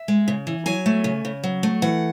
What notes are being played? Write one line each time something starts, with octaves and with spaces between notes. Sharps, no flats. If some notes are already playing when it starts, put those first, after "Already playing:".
Already playing: E5
G#3
C#3
E3
F#3 G#5
A3
C#3
C#3
F#3
A3
E3 F#5